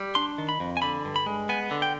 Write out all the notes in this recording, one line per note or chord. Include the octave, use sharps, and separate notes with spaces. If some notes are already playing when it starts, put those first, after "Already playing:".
Already playing: G3
D4 C6
D#3
B5
F2
G#5
D3 B5
G2
B5
G#3
B3 G#5
D3
G5